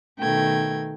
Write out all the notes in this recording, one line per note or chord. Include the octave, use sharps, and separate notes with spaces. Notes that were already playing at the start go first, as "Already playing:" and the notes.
B2 D#3 A3 G5 G#6